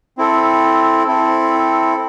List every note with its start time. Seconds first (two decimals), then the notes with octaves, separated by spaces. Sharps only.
0.18 C4 E4 A4
1.07 C4 E4 A4